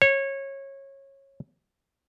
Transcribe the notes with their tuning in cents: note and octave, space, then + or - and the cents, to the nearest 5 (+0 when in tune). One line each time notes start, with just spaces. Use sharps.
C#5 -20